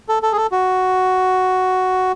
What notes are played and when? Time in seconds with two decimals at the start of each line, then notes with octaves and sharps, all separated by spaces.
0.09 A4
0.23 A4
0.32 G#4
0.37 A4
0.52 F#4